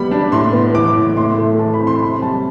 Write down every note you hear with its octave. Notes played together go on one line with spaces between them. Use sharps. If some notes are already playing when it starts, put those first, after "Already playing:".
Already playing: G3 B3 B5
D4
A2 C6
B3
E3 D6
A2
A2 C6
A3
E3 A5
B5
C4
C6
C3 B5
G3 A5